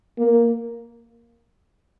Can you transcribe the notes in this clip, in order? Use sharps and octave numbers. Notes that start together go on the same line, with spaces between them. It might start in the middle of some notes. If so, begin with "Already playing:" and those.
A#3